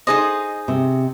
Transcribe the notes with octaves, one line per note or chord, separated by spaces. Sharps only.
D#4 G#4 C5 D#5
C3